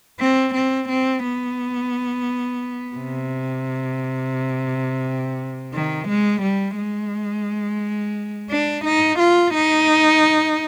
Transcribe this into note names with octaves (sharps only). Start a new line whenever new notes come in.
C4
C4
C4
B3
C3
D#3
G#3
G3
G#3
D4
D#4
F4
D#4